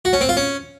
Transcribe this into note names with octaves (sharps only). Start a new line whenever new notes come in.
F#4
C#4
C4
F4
C#4